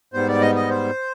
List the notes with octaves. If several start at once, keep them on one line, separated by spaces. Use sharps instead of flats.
G#2 G3 B3 C5
D5
D#5
D#5
C5